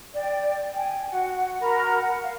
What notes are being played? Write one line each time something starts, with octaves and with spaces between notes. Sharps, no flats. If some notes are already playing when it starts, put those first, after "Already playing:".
D5 G5
G5 G#5
F#4 F#5
F#4 A#4 A#5 B5
F#5
F5